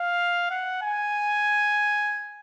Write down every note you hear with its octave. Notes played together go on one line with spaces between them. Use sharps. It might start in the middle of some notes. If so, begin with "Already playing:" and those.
Already playing: F5
F#5
G#5